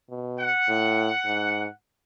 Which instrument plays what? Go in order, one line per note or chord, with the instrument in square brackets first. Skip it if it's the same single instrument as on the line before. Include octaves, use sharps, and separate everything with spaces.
[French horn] B2
[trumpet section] F#5
[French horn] A2
G#2